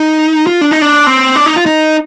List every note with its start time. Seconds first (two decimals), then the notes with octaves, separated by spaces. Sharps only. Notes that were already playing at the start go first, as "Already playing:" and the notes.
Already playing: D#4
0.47 F4
0.61 D4
0.71 D#4
0.82 D4
1.07 C4
1.36 D4
1.46 D#4
1.56 F4
1.66 D#4